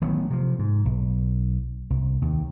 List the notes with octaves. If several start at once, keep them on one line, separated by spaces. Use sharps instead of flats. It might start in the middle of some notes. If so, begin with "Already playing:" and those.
A1 D#3 F#3 B3
C3 F3
G#2
B1
C2
D#2